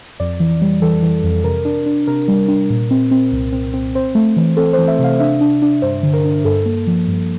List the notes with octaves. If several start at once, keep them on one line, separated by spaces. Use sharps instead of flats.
F2 D5
E3
G3
E3 A4
E3
F2
C3 A#4
D4
D4
C3 A#4
G3
D4
A#2
C4
C4
C2
C4
C4
C4 C5
A3
E3
C4 A4
C5
E3
E5
C3
F5
D4 E5
D4
D4
G2 C5
D3
A#4
D4
G2 A4
A#3
F3
G2